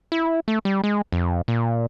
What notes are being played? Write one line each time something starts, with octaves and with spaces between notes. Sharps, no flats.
E4
A3
G3
G#3
F2
A#2